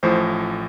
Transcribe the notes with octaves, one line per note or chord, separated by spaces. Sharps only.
A1 A2 F3 C5